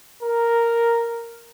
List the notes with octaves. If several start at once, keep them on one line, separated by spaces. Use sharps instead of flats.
A#4